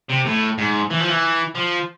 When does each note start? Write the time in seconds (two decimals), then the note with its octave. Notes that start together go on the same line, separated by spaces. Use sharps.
0.09 C3
0.25 A2
0.58 G#2
0.91 E3
1.00 F3
1.09 E3
1.56 F3